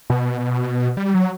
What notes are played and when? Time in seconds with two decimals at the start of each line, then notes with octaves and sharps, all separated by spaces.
0.10 B2
0.97 G3
1.14 F#3